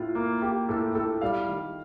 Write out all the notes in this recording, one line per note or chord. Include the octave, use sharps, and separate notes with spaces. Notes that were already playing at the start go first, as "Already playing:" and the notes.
Already playing: A2 F4
A#3
A#3 G4
A2 A4
A2 A4
G3 F5
D#3